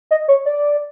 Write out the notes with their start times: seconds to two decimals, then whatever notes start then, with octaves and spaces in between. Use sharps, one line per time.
0.11 D#5
0.28 C#5
0.46 D5